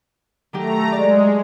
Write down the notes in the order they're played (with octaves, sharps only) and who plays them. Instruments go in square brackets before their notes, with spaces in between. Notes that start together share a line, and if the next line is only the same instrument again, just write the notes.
[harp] D#3 F#3 G4 [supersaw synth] A3 A#5
[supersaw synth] G#3 [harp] D5